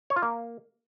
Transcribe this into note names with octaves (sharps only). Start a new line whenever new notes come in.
C#5
F4
A#3